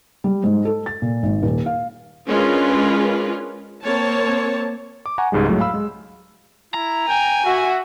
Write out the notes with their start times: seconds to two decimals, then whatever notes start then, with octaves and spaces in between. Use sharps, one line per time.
0.24 G3
0.44 G#2
0.65 A4
0.86 A6
1.02 A#2
1.23 G#1
1.43 D#1
1.66 F5
2.27 G#3 C#4 D4 F4 A#4 B4
3.84 A#3 C4 C#5 A5
5.06 D6
5.18 F#5 G#5 A#5 C#6
5.32 C#2 G#2 G3 G#3
5.48 F2 A2 F#3 G#3 A3
5.60 F5 B5 E6
5.74 G#3
6.74 E4 A#5
7.08 G5 G#5
7.46 F#4 E5